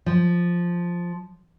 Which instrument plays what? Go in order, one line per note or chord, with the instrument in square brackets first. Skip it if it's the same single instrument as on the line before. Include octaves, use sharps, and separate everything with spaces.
[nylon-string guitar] F3